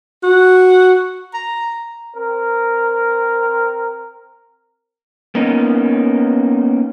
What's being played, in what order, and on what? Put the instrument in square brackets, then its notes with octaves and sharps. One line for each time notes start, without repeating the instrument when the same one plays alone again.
[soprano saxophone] F#4
A#5
[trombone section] C4 A#4
[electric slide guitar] A#3 B3 C#4 D#4